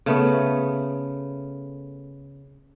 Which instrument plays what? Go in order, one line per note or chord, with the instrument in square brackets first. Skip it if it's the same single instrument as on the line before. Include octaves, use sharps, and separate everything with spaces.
[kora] C#3 A3 B3